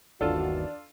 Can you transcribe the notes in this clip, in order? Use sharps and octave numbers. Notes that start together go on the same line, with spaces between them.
G1 D#2 D#3 E3 D4 F4 F#4 A4